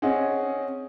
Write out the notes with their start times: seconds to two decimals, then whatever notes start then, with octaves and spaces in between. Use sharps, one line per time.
0.02 C4 C#4 G#4 D#5 F#5